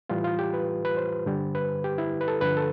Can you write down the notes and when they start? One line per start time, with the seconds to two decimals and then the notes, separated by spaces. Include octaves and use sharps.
0.09 A2 E3 G3 F4
0.24 F4
0.39 G4
0.54 B4
0.85 B4
0.97 C5
1.26 G2 D3 G3
1.55 B4
1.84 G4
1.98 E4
2.21 B4
2.28 A4
2.41 G2 D3 F3 B4
2.57 A4